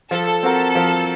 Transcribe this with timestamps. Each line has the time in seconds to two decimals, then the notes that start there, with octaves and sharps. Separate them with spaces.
0.11 F3 A4
0.43 C4 F#4 A#4
0.75 F3